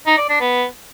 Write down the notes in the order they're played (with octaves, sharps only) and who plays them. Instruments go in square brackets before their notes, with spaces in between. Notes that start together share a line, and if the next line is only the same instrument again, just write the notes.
[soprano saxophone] D#4
D5
D4
B3